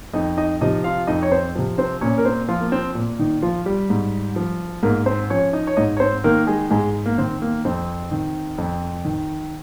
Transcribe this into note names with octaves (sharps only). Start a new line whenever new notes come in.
F2 D#4 D#5
D#4 D#5
C3 F3 D#4 D#5
F4 F5
F2 D#4 D#5
C#5
C4 C5
C3 F3
C4 C5
A#2 C#4 C#5
A#4
C4 C5
F3 F4
A#3
C4
A#2
D#3 D#4
F3 F4
G3 G4
G#2
F3
G#2 A#3 A#4
C4 C5
F3 C#4 C#5
D#4 D#5
C#5
G#2 D#4 D#5
C#5
C4 C5
D#3 A#3 A#4
G#3 G#4
G#2 G#3 G#4
A#3
D#3 C4
A#3
F2 C4
D#3
F2
D#3